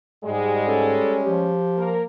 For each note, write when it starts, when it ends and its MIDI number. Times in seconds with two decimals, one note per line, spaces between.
0.25 1.01 44
0.25 1.57 55
0.25 1.57 56
0.25 0.66 68
0.67 1.58 61
0.67 1.18 69
1.25 2.05 53
1.25 1.90 67
1.77 2.04 58
1.77 2.04 70